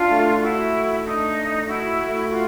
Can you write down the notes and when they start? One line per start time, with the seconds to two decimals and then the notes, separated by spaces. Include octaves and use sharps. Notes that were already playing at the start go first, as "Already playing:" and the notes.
Already playing: D4 F4
0.11 A3
0.42 E4 F#4
0.74 A3
1.04 D4 D#4
1.36 A3
1.67 E4 F#4
1.99 A3
2.30 F4 F#4